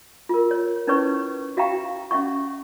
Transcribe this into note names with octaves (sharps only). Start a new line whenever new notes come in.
F4 A#4
C#5
C#4 D#4 E4 B4 C#5 C#6
F#4 E5 F5 G5 A#5 C#6
C#4 E5 F#5 C#6